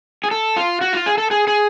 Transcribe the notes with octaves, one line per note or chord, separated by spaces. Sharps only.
G#4
A4
F4
F#4
F4
G#4
A4
G#4
G#4